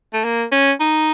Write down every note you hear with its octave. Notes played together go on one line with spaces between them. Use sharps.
A3
A#3
C#4
D#4